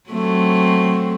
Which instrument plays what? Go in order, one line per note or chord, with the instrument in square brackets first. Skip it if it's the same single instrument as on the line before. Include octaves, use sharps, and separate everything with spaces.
[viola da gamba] F#3 A3 C4